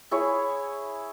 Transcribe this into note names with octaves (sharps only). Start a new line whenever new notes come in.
E4 G#4 C#5